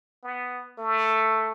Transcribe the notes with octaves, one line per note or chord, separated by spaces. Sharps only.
B3
A3